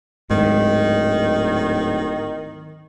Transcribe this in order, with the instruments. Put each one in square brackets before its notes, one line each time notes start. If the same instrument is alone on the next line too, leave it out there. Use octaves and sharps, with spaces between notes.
[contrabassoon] D1 [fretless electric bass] G#2 [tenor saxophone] D#3